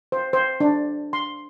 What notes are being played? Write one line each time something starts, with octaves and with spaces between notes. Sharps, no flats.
C5
C5
D4
C6